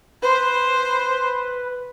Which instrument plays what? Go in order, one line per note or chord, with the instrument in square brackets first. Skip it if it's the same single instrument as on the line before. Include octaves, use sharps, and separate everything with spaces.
[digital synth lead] B4 [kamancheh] C5